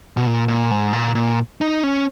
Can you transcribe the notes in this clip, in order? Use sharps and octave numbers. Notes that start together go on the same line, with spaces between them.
B2
A#2
A#2
G#2
A#2
A#2
D#4
C#4